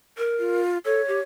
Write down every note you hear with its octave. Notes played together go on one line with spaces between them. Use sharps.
A#4
F4
A4 C#5
G4